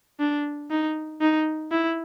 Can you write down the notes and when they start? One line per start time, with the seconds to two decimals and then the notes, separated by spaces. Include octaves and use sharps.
0.20 D4
0.71 D#4
1.21 D#4
1.71 E4